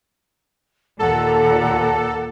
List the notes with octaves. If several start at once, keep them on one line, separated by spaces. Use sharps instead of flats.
D#2 A#2 A4 F#5 A#5 D6